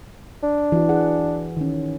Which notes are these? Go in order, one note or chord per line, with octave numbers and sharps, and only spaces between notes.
D4
E3 F#4
G#4 F#5
D#3 C#4